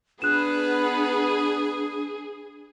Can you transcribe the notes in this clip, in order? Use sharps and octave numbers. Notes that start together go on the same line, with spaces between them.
B3 D4 G#4 B4 F#6 E7